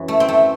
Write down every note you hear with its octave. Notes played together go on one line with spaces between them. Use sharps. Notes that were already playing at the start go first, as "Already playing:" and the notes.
Already playing: F#2 E3
A3
C4
A3